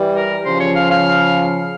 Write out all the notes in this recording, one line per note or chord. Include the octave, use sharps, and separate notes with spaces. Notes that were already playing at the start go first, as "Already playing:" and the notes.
Already playing: E3 G3
A#4
C#3 F3 C5
C#5
F5
F5